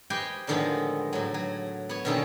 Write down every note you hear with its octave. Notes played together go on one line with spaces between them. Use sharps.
G4 B4 C5 D#5 G5 G#5
A2 D3 D#3 F3 G#3 B3
A2 F#3
F#3
B3 C#5
B2 D3 D#3 A3 C4 C#4